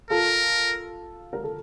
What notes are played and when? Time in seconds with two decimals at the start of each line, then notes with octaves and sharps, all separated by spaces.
0.10 F4 A4 A#4
1.33 A#4
1.44 A4